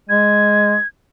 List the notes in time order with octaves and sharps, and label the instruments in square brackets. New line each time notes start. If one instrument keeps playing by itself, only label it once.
[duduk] G#3 [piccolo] G#6